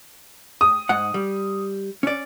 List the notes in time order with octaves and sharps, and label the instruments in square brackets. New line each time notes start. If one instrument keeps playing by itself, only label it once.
[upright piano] D#6
[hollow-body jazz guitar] G#2 F#5
G3
C#4 D5